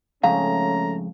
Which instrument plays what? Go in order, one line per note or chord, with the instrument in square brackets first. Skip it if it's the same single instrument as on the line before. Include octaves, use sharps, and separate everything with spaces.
[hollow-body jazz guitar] F2 G#2 C#3 [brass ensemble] A3 C#4 [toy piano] F5 [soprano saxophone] A#5